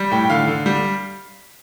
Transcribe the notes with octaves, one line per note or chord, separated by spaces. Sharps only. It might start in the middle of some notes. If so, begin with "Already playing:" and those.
Already playing: G3
A2 G5
G5
D3 F5
D3
G3